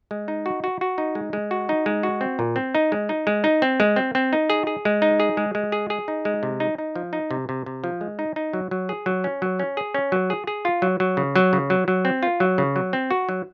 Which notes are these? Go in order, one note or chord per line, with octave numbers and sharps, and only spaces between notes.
G#3
D#4
F#4
F#4
F#4
D#4
G#3
G#3
F#4
D#4
G#3
F#4
C4
A#2
C4
D#4
G#3
D#4
G#3
D#4
C4
G#3
C4
C4
D#4
G#4
G#4
G#3
D#4
G#4
G#3
G#3
G#4
G#4
D#4
G#3
C3
D#4
D#4
F3
D#4
C3
C3
C3
F3
G#3
D#4
D#4
F#3
F#3
G#4
F#3
C#4
F#3
C#4
G#4
C#4
F#3
G#4
G#4
F4
F#3
F#3
C#3
F#3
C#3
F#3
F#3
C4
F4
F#3
C#3
F#3
C4
F#4
F#3